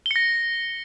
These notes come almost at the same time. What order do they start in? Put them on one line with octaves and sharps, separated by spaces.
G7 C#7 A#6